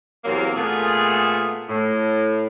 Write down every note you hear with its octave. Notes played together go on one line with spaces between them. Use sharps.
E2 C3 F#3 A#3
A#2 A3 B3 F4 G#4
A2